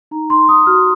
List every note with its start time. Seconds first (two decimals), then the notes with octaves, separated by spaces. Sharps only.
0.11 D#4 A#5
0.30 D#4 C6
0.48 D#4 D#6
0.67 F#4 F6